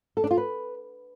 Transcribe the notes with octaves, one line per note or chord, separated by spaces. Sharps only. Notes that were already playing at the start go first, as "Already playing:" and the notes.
A4
D4
F4
B4